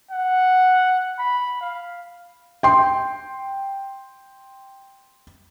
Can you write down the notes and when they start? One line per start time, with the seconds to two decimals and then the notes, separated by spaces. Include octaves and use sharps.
0.11 F#5
1.19 B5
1.61 F5
2.63 G5 C6